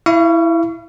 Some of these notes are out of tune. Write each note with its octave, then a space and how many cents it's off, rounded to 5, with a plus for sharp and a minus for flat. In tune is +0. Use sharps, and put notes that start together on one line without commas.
E4 +0 F5 -40 C#6 +20